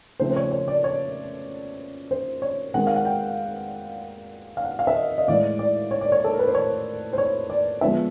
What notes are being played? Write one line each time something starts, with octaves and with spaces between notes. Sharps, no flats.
C#3 F3 A3 C4 C5
C5
C#5
C#5
D5
C#5
C5
C#5
D#3 G#3 C4 F#5
F5
F#5
G5
F5
F#5
F5
E5
D#5
D#5
A2 E3 G#3 D5
D5
C#5
D5
C#5
A4
A#4
B4
C5
C#5
C5
C#5
D5
D3 F3 G#3 B3 E5